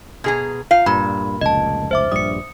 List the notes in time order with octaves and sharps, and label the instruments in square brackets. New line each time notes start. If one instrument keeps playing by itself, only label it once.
[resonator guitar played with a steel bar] B2 G#4 A#5
[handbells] F4 [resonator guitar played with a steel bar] F5
[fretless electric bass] G2 [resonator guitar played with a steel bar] A#2 [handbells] B5
[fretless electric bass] F1 C#2 [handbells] D#5 A5
[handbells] C5 E5 D6
[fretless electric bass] A#1 G2 G3 [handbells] D#6 C#7